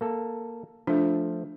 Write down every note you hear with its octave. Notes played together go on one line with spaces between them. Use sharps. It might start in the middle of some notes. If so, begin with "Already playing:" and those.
A#3 A4
F3 A3 D4